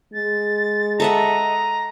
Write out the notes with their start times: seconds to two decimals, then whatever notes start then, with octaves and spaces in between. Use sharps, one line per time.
0.14 G#3 A6
1.00 A4 D#5 E5 F#5 A#5